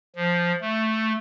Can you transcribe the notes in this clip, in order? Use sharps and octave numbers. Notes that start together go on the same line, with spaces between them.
F3
A3